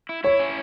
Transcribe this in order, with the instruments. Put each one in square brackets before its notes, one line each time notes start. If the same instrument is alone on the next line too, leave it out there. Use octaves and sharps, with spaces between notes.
[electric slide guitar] E4
[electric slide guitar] E4 [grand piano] C#5
[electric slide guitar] C#4